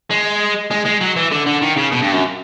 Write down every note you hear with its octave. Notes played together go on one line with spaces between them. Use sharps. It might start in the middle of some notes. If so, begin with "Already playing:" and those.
G#3
G#3
G#3
F#3
E3
D3
D3
D#3
C#3
B2
G2
F#2